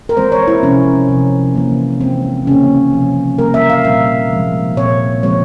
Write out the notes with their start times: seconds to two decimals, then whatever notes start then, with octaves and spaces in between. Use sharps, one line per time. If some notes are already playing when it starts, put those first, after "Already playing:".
0.09 A#4
0.17 E3 G#3 C4 C5
0.32 C#5
0.48 E4
0.63 C3 F3 G#3 C4 C#4
1.09 C3 F3 C4
1.55 E3 A#3
2.01 E3 G#3 C4
2.47 C#3 E3 A#3 C#4
2.93 C3 F3 C4
3.39 E3 G3 A#3 A#4
3.54 E5
3.70 F5
3.85 A#2 G3 C4 E5
4.31 C3 F3 G#3
4.77 A#2 G#3 C4 C#5
5.23 C#3 F3 G#3 C4 C#5